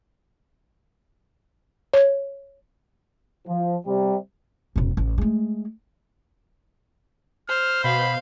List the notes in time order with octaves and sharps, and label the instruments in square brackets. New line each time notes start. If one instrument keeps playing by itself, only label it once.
[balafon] C#5
[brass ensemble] F3
C3 G3
[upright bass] E1 F#2
A1
G#3 A3
[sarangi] C5 [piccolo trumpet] F6
[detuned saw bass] B2 [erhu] F5 [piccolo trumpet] B5